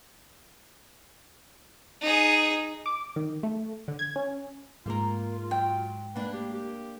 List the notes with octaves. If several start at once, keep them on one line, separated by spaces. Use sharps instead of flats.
D#4 G#4
D6
D#3
A3
D3
G#6
C#4
G#2 G#3 A#3 F4 A#4
F#3 G5
A#3 D4 B4
G4
G4